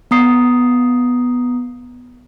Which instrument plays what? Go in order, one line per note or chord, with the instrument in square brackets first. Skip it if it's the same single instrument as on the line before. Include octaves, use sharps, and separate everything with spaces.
[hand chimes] B3 A#5 D#6 C7